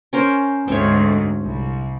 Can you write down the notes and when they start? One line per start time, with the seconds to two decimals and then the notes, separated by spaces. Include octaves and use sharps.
0.13 C#4 A#4 C5
0.68 D2 G#2 C4 C#5
1.43 C2